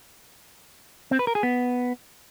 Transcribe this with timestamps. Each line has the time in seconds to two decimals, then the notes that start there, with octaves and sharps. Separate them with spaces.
1.11 C4
1.19 B4
1.27 A#4
1.35 G#4
1.43 B3